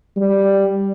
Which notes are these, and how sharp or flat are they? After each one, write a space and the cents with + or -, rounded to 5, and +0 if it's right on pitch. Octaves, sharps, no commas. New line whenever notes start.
G3 +0